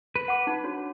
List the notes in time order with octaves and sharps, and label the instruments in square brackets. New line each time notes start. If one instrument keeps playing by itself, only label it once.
[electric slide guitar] B4
[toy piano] F#5 D6
D#4
D4 F#4 C#5